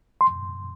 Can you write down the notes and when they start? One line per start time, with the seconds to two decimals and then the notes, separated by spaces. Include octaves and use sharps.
0.21 C6